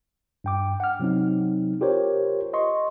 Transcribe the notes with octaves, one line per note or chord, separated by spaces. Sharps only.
G2 G5 D6
F#5 F6
C3 F#3 C4 D#4
F4 G4 A#4 C5 C#5
D#5 C6 C#6